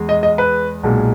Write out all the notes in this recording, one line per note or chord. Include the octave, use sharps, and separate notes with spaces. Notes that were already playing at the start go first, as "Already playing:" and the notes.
Already playing: E2 G#3
D#5
D#5
B4
B1 A#2 G#3